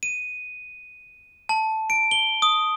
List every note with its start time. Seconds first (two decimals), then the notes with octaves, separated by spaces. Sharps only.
0.03 D#7
1.49 A5
1.90 D7
2.11 G7
2.42 D#6